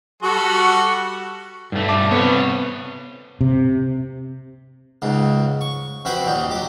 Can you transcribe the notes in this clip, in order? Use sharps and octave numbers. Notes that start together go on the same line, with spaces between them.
G3 F#4 A4 C#6
G2 A3
A5 D6
C3 B3 C#5
C3
C#2 G#2 C#3
C#6
F2 C4 F#4 B4 C5 G5
D#2 A#2 D#4
F#3 G4